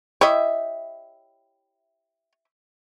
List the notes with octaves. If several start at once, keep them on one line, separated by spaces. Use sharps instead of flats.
E4 G4 C#5 D#5 E5